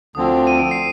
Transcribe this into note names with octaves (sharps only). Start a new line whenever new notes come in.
D2 D3 F3 C4 D#6
D#7
D7
C7